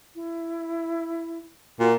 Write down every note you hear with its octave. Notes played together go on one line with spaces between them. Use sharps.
E4
A#2 F#4